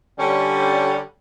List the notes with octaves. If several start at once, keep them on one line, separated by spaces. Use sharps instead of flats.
D3 G3 C#4